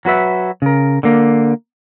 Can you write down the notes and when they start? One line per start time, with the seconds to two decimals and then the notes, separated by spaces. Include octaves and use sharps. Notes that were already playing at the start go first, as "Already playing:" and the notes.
0.05 F#3 F#4 B4 E5
0.62 C#3 A#4
1.03 D3 A#3